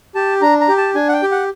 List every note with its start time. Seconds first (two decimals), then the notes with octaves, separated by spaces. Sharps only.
0.15 G4 A5
0.42 D4 A#5
0.61 A#5
0.69 G4
0.78 A5
0.95 D4 G#5
1.09 F#5
1.13 G5
1.23 G4
1.32 F#5